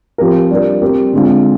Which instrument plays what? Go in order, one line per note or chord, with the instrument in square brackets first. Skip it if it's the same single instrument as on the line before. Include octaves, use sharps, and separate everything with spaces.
[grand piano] F3 C4 G4 A#4
G3 D4 F4 A#4
G3 C4 G4 A#4
D3 G#3 C4 F4